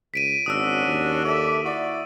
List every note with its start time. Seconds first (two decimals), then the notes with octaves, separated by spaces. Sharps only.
0.14 C#2 B6 D7 D#7
0.46 G#1 C#4 D4 F#4 D#6 E6
0.86 D#2
1.24 A4 D5 E5
1.64 E4 F#4 D5